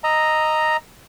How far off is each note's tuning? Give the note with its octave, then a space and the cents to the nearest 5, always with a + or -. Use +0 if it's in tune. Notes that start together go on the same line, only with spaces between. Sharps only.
D#5 +0 A#5 +0 E6 +0